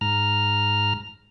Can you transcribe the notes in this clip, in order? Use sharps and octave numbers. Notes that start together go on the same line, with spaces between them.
G#2 A#5 F6